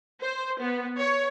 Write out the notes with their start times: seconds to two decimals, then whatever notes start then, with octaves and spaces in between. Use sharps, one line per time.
0.22 C5
0.60 B3
0.98 C#5